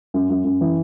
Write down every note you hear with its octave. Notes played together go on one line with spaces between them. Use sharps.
F#2
F#2
F#2
E3